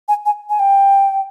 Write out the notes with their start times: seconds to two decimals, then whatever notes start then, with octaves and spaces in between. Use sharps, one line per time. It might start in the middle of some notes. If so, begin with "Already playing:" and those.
0.08 G#5
0.26 G#5
0.49 G#5
0.59 G5